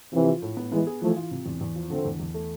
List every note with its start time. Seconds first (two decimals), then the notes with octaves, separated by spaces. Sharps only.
0.12 C3 E3 F3
0.28 F4
0.42 A2
0.57 B3
0.72 E3 G#3 B3
0.87 G#4
1.01 E3 F3 A3
1.16 F4
1.31 C3
1.46 E2
1.61 E2
1.75 F3
1.90 D3 A3 C4
2.05 E2
2.20 E2
2.34 A3